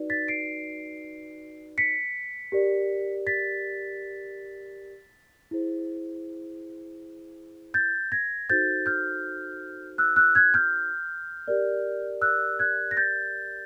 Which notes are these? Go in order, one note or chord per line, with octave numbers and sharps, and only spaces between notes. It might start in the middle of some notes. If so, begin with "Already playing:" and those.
Already playing: D#4 F#4 B4 D5
A6 B6
C7 D7
B6 C#7
G4 A#4 D5
A6 B6
E4 G#4 C5
G6 A6
G#6 A#6
D#4 F#4 A4 C5 G6 A6
F6 G6
E6 F#6
E6 F#6
F#6 G#6
F6 G6
G4 A#4 D5
E6 F#6
F#6 G#6
A#6
G6 A6